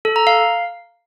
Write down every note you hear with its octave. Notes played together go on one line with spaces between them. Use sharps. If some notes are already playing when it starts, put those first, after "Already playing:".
A4
A#5
F5